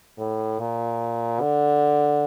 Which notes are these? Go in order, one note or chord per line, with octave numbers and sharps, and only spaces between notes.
A2
A#2
D3